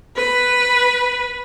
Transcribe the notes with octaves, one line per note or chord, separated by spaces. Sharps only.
B4